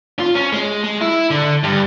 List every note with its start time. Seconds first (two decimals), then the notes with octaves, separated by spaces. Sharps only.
0.20 F4
0.35 C#4
0.53 G#3
0.84 G#3
1.01 E4
1.31 D3
1.63 G2